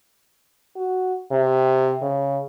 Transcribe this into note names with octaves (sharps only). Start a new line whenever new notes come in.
F#4
C3
C#3